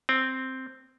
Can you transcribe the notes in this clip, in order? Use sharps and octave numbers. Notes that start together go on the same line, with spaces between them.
C4